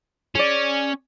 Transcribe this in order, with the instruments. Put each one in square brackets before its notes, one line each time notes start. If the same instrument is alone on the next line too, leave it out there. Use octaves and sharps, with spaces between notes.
[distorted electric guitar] C#4 [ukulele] G#4 D5